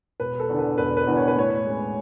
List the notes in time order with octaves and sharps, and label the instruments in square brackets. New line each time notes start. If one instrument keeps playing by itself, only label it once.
[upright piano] E1 B4
A4
E2 D3
B4
E1 B4
B4
E2 D3
C#5
B4
A2 C#5
G#3 C#4